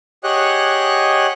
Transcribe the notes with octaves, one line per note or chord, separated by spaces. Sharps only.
G4 G#4 C#5 D#5 F#5 F#6